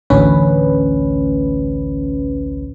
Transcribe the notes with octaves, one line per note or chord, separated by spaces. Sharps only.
A1 D2 C#4 B4